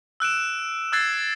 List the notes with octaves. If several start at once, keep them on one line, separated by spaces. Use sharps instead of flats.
E6 F#6 D7 E7
E6 F#6 G#6 A6 C7